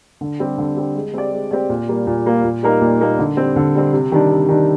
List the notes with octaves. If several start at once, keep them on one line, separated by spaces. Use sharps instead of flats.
D3
G3 C4 G4
D3
G3 C4 G4
G#3
C4 G4 D5
G#3
C4 G4 D5
A#2
G3 A#3 F4
A#2
G3 A#3 F4
A#2
G3 A#3 D#4 A#4
A#2
G3 A#3 D#4 A#4
D3
G3 C4
D3
G3 C4
C3
D#3 G3 D4
C3
D#3 G3 D4